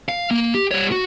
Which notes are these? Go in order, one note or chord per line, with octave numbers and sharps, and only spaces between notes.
F5
A#3
G4
G3 C#5
F#4